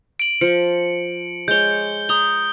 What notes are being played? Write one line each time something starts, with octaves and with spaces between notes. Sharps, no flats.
D7 F#7
F3 C#7
G#3 C#5 G6 G7
A#5 D#6 G7